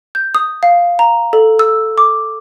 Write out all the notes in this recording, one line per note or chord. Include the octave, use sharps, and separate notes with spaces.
G6
D#6
F5
A#5
A4
E6
D6